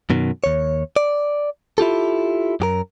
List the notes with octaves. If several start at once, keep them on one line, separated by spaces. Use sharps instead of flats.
F#2 B2 D#3
D#2 C#5
D5
E4 F4 G4 A4
F#2 G4 A#4